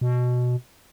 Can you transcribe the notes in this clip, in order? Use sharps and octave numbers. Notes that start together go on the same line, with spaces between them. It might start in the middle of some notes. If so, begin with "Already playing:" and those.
B2